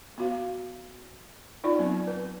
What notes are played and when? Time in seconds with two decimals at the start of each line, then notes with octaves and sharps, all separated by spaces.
0.18 B3 F#4 F5
1.64 D#4 F4 D5
1.79 F#3 B3 C4
2.07 B4